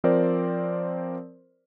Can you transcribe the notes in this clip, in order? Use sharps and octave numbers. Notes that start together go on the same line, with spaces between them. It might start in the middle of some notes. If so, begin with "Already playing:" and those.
F3 C4 A#4 C5 D5